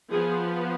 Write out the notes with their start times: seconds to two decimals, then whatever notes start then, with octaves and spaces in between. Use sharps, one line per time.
0.10 F3 B3 G#4